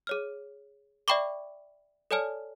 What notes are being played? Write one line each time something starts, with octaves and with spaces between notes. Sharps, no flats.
G#4 C#5 F6
D5 E5 G5 B5 C#6 D6
A4 C#5 D5 G#5 A5 F6